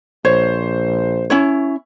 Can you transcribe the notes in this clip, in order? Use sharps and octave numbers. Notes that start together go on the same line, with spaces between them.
A#1 C5 C#5
C#4 E4 C#5